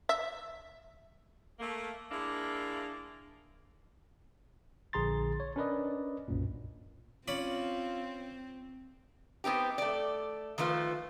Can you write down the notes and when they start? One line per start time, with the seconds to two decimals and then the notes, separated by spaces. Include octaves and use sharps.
0.09 E5
1.60 A3 A#3
2.10 G#3 A#3 D4 E4
4.93 A#1 D3 G#4 A#5 C6 A6
5.40 C#5
5.56 C#4 D4 A#4 B4 D5 D#5
6.28 B1 F#2 A#2
7.28 C4 C#4 F4 D5 B5
9.44 B3 C4 D#4 G4
9.78 A3 D5
10.58 D#3 F3 A3 F4 B4